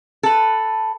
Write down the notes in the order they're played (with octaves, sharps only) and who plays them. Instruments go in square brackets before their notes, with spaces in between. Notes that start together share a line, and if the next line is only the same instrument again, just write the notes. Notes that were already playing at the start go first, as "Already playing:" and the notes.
[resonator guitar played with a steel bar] A4 B4